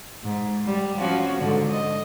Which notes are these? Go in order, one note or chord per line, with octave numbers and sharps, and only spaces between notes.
G#2
G3
F3 C#4 F#4
G#2 D3
D#5